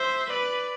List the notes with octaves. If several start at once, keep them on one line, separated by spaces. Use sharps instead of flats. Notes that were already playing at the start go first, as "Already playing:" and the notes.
Already playing: C5 E5
B4 D5